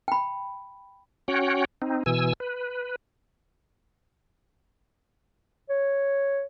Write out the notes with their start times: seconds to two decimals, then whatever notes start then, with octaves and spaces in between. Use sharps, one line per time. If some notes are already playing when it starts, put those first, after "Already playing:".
0.08 G5 B5
1.28 C#4 F#4 C#5 F#5 G5
1.82 C4 D#4
2.06 B2 E3 G#5 E6
2.40 B4
5.69 C#5